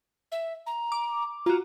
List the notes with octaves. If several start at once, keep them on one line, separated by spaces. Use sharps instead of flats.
E5
A#5
D6
F4 F#4 A#5